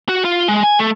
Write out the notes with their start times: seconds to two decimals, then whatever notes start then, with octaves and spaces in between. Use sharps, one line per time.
0.09 F#4
0.25 F4
0.48 G#3
0.63 G#5
0.79 A3